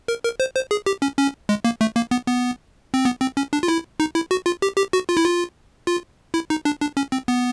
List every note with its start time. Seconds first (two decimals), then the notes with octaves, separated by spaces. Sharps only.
0.08 A#4
0.24 A#4
0.40 C5
0.55 C5
0.71 G#4
0.86 G4
1.02 C#4
1.18 C#4
1.49 G#3
1.65 A#3
1.81 A3
1.96 A#3
2.11 B3
2.27 B3
2.94 C4
3.05 B3
3.21 C4
3.37 C#4
3.53 D4
3.63 F4
3.68 E4
4.00 D#4
4.15 E4
4.31 F#4
4.46 F4
4.62 G4
4.77 G4
4.93 F#4
5.09 F4
5.17 E4
5.24 F4
5.87 F4
6.34 E4
6.50 D#4
6.65 D4
6.81 D4
6.97 C#4
7.12 C4
7.28 B3